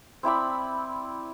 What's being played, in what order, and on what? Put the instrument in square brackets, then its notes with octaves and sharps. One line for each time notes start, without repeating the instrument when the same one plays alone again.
[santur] C4 E4 D5 B5